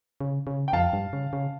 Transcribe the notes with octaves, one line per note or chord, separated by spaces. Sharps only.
C#3
C#3
G5
F2 F5 A5
G2
C#3
C#3